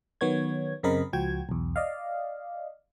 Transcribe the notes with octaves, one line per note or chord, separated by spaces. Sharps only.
D#3 F#3 B3 C#5 G#6
F#2 C#3 C4 A#4 D#5 B5
C#2 F3 F#4 G5 G#6
B1 E2
D5 D#5 F5